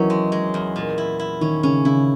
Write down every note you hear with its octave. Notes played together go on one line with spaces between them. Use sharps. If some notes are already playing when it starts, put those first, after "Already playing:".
Already playing: D#3 E3 F#3 C#4
G#3
G#3
E2
A#2
E4
E4
D#3 C#4
C#3 C#4
C#3 E4